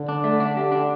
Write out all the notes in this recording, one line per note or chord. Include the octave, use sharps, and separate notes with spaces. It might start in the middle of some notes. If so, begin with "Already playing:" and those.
Already playing: D3
D4
A3
D4
G4
D4